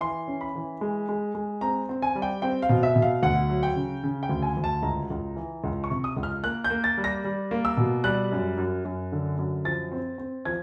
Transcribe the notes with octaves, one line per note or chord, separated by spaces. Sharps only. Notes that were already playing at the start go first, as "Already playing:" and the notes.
E3 C6
C#4
B5
E3
G#3
G#3
G#3
C4 A#5
C4
G#5
G3
G5
C4 G5
F5
B2
E5
B2
F5
D2 F#5
F#3
G5
C#3
C#3
G5
D2
G#5
D2
A5
C#2 A#5
C#2
E3
C#2
C#6
C3
D#6
C#2
F6
A#3 F#6
G6
A#3
A6
G3
A#6
G3
A#3
E6
B2
G3 F#6
F#2
F#2
F#2
D3
F#2
F3 A6
C4
C4
F3 G#6